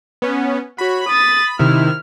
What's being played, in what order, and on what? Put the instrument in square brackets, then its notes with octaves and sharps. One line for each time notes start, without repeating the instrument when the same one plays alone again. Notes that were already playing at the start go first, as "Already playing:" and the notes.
[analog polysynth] B3 C#4
[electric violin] F#4 C#5 [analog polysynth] B5
[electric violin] D#6 A6
[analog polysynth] C3 D#3 E4 [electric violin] F6